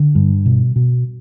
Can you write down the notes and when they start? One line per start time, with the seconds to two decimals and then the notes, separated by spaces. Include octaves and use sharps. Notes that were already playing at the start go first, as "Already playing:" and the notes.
Already playing: D3
0.15 G2
0.46 B2
0.76 B2